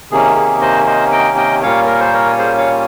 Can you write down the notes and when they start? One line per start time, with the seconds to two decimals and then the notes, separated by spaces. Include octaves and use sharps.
0.11 C3 D#3 A#3 C#4 G#4
0.36 G#4
0.61 C5 D#5
0.86 C5 D#5
1.12 D#5 G5
1.37 D#5 G5
1.62 A#2 G3 A#3 C#4 C#5 F5
1.86 A#4
2.00 C5
2.14 A#4 C#5
2.39 G#4 C5
2.57 C#5 F5